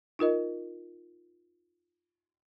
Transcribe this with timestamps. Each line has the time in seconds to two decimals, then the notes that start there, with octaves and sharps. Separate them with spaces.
0.19 D#4 F4 A#4 D#5